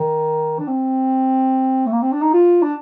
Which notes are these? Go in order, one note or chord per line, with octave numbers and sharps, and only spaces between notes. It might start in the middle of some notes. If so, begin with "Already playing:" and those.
Already playing: D#3
D4
C4
A3
A#3
C4
D4
D#4
F4
D4